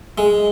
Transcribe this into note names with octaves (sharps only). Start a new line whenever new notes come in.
G#3